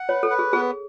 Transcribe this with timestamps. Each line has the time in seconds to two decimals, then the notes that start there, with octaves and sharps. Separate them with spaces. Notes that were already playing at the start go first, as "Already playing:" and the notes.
Already playing: F#5
0.09 B4 C#5
0.23 A4
0.30 B4
0.39 G#4
0.53 B3 G#4